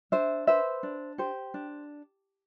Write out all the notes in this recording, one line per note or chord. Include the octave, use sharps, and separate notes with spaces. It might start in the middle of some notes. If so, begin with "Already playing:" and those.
D4 C5 E5
B4 C5 E5
D4
G4 C5
D4